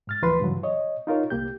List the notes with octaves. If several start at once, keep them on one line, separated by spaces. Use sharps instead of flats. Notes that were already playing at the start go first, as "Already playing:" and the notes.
G#2 F6 A6
D2 E3 F3 B4 C6
G2 C#3 E3 F#3
C#5 D#5
D#4 F4 A#4 C#5
C2 A#3 G4 G6